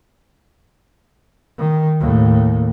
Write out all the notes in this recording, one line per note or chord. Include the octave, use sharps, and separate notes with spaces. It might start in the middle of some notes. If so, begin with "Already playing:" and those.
D#3
D#2 A2